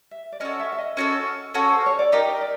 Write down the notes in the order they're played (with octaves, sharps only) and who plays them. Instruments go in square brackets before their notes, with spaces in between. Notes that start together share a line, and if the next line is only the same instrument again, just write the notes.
[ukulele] E5
D5
[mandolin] C#4 F#4 A4 [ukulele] D#5
[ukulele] E5
E5
D#5
[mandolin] C#4 F#4 A4
C#4 F#4 A4
[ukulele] C5
C#5
D5
[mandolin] D#4 G4 A#4 [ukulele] D#5
[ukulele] D5